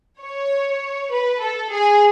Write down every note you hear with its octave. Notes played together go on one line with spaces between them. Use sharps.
C#5
B4
A4
G#4